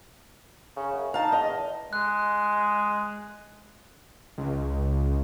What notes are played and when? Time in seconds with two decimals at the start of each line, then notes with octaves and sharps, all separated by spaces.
0.76 C#3
0.93 F#2
1.14 D#4 F5 A5
1.32 E2 D#5
1.93 G#3 F#6
4.38 C#2